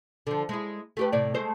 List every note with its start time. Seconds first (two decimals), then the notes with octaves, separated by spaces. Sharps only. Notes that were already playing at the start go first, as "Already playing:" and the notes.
0.27 D3 F3
0.49 G#3 E4
0.97 A3 G4 B4
1.12 A2 C3 D5
1.34 G#3 A3 C5